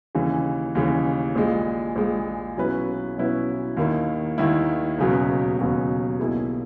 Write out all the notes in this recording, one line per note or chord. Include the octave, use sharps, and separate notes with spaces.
D#2 C#3 E3
D#2 C#3 E3
A#1 A#2 G#3
A#1 A#2 G#3
B2 F#3 C#4 E4 B4
B2 F#3 C#4 E4 B4
D#2 D#3 A#3 E4
D#2 D#3 A#3 E4
E1 D#2 C#3 F#3 B3
E1 D#2 C#3 F#3 B3
B1 B2 A#3 E4 G#4